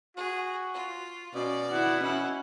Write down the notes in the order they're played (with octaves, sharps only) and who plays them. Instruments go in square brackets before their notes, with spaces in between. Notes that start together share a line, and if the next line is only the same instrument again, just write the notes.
[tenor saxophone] F#4 [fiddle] G#4
[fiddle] F4
[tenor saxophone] B2 [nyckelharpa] C#4 [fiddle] D5
[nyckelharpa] E4 [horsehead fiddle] F#5
[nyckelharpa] C#4 [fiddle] E4